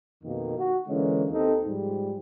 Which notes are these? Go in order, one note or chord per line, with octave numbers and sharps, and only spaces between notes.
F2 B2 D#3 A#3
F#4
D3 E3 G#3 A#3 C#4
D#2 C4 D#4 A4
G#2 F3 G3